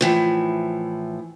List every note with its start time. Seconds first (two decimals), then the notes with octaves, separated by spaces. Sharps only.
0.01 A2 E3 F3